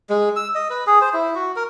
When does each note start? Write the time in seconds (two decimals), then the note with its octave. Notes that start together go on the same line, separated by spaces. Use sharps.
0.10 G#3
0.36 E6
0.55 D#5
0.70 B4
0.87 G#4
1.01 C5
1.14 E4
1.35 F#4
1.56 A#4